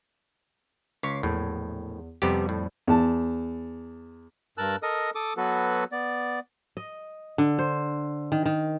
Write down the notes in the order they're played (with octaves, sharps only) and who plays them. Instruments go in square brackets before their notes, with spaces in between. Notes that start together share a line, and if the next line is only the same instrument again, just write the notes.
[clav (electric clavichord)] C#2 C#5 [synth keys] D6 B6 C7
[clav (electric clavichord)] A#1 A2 [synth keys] E2
[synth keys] F2 F3 G3 [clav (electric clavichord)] C3 B3 G4
[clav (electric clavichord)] A2
[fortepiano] E2 A5
[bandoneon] G2 A#4 A5 E6 F#6
A4 A#4 D#5 D#6
A4 D6 D#6
F#3 B3 F#4 A4 B4
B3 D5
[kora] D#5
D3
C5
D#3
D#3